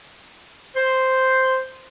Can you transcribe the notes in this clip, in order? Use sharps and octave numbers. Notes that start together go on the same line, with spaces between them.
C5